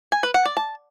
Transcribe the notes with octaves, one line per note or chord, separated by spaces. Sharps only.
G#5
B4
F#5
D5
A5